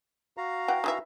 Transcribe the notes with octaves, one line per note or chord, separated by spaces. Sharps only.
F#4 F5 A#5
E3 F#5 G5
D#3 E3 E5